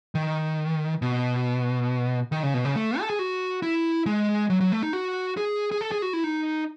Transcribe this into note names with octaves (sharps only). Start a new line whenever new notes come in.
D#3
B2
D#3
C#3
B2
C#3
A3
A4
G#4
F#4
E4
G#3
F#3
F#3
A3
D#4
F#4
G#4
G#4
A4
G#4
F#4
E4
D#4